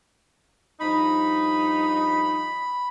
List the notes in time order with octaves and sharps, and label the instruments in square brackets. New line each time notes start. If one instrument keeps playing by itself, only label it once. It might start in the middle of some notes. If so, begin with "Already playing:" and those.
[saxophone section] G2 F3 D#4 [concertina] B5